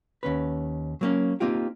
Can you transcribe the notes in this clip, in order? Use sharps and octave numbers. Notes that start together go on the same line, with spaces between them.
D#2 C#4 B4
F#3 A#3 C#4
A#3 C4 D#4 F4 G4